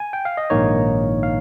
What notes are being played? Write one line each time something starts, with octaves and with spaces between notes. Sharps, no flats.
G#5
G5
F5
D#5
A#1 G#2 D#3 A#3 D#4 C#5
F5